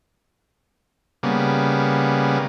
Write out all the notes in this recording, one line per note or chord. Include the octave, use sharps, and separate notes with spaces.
C#3 G3 A#3 B3